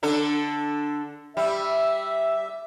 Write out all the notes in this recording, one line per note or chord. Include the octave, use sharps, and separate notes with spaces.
D3 D4 A4
G3 E5